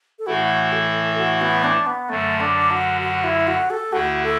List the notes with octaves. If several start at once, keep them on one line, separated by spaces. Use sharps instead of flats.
A4
A2 E3 A3 E4 F#4
A4
F#4
B3
D4
B3
F#2 D3 F#3 A3
D4
F#4
F#4
E4
F#4
A4
D2 D3 A3 E4 F#4
A4